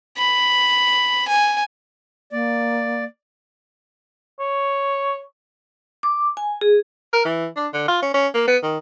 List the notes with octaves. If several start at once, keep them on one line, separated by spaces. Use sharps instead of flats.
B5
G#5
A#3 D5
C#5
D6
G#5
G#4
A#4
E3
D4
D3
F4
C#4
C#4
A#3
B3
D#3